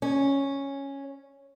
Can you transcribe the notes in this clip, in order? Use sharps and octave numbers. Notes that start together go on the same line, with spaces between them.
C#4